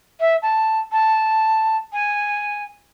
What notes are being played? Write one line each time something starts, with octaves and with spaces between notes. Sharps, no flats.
E5
A5
A5
G#5